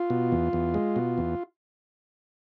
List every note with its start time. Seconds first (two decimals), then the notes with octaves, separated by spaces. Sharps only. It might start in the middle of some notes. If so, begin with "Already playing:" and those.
Already playing: F4
0.10 B2
0.32 E2
0.53 E2
0.74 G#3
0.96 B2
1.18 E2